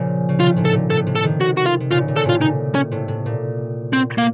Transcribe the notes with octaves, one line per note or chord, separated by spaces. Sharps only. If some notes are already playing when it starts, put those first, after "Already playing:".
Already playing: A#2 C#3 F3
C#3
C3 D#3 F4
A2 C3
A4
A#2
A2 C3 A4
A2 C3
A4
C3 D#3
F#4
F#4
F4
C3
A#2 C#3 F4
A#2
C#3 A4
A2 C3 F4
A#2 D#4
C#4
A2 C3
A2
A#2
C4
A#3